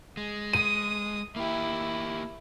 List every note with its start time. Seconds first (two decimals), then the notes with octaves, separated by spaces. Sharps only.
0.17 G#3
0.53 D#6 D#7
1.36 A#3 E4 G4